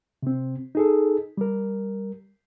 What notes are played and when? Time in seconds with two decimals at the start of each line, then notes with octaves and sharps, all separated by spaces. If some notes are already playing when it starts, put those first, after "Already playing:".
0.23 C3 C4
0.75 D#4 G#4 A4
1.37 G3 A#4